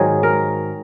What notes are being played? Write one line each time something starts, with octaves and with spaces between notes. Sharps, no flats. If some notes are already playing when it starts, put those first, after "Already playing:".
Already playing: G#2 D#3 F#3 G#4
A#4